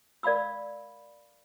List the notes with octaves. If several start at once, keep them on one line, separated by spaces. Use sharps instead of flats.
A#4 D5 F5 B5 E6